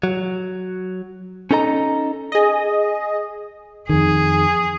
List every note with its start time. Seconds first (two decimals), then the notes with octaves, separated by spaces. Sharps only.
0.03 F#3
1.51 C#4 D#4 A4 D#5 A#5
2.32 G#4 D#5
3.89 F2 D#3 G#4